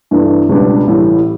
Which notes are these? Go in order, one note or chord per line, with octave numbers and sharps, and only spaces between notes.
G2 E3 A3 D4
C#2 B2 G3 D4
A1 A2 G3